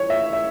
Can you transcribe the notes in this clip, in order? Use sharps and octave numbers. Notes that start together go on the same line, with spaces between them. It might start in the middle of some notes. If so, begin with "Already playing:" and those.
Already playing: E3 C#5
E5
E5